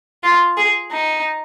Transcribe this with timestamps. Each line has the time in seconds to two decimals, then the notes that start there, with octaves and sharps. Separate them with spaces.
0.23 F4
0.57 G#4
0.91 D#4